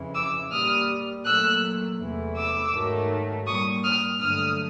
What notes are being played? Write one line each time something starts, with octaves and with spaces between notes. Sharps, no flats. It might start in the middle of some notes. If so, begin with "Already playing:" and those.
Already playing: F2 C#3 E3
D6 E6
A#2 G3 D#6 F6
A#2 F#3 A3 E6 F#6
E2 C3 E3 A3
D6 E6
G#2 D#3 F#3 A3
A#2 G3 C#6 D#6
D#6 F6
G2 D3 F#3 A3 D#6 F6